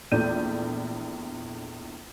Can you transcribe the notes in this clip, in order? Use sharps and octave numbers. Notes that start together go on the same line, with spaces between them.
A#1 E2 A3 D5 G6 D#7